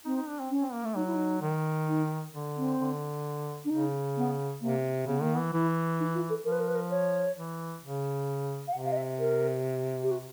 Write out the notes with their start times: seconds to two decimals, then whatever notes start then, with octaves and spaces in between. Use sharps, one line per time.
0.05 C4 D#4
0.17 D#4
0.28 D4
0.39 C4
0.50 C#4
0.62 C4
0.73 A#3
0.85 A3
0.96 F#3 D#4
1.06 E4
1.15 D#4
1.42 D#3
1.88 D#4
2.33 D3
2.57 C4
2.79 D3
3.65 D4
3.70 C#3 D#4
4.17 B3
4.61 C3 A#3
5.07 C#3 B3
5.21 D#3 A#3
5.34 B3
5.38 E3
5.53 E3 E4
6.00 D#4
6.14 F4
6.30 A4
6.45 F3 A#4
6.52 B4
6.60 A#4
6.68 B4
6.75 A#4
6.90 C#5
7.35 E3
7.82 C#3
8.68 F5
8.73 C3 F#5
8.85 F5
8.92 D#5
8.96 E5
9.19 A#4
10.03 G4
10.11 F#4